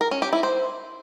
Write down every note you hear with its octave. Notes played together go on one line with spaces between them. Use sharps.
A#4
C#4
G4
E4
C5